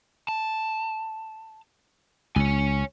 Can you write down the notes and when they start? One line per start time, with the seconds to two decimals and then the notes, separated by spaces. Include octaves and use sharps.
0.28 A5
2.36 C#2 C#5 G#5